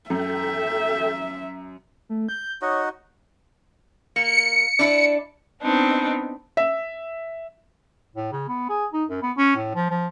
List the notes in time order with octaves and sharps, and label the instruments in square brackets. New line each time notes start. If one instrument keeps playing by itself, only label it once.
[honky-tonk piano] F#2 [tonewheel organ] A4 G5 [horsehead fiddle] E5
[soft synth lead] A3
G6
[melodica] D#4 F#4 D#5 [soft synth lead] C#5
[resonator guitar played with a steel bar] A#3 [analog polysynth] C#7
[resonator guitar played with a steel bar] D4 E4
[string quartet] B3 C4 D4 D#4
[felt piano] E5
[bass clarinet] A2
C#3
B3
G#4
D#4
F#2
B3
C#4
A2
F3
F3